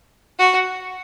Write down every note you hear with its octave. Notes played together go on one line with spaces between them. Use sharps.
F#4